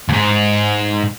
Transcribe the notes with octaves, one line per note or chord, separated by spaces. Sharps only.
D#2 G#2